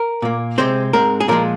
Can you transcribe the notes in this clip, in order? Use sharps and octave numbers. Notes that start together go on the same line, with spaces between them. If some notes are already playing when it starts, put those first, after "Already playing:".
Already playing: A#4
A#2 A#3
C3 G#3 C4 C5
G#2 G#3 C4 A#4
G#4
A#2 F3 G#3 A#4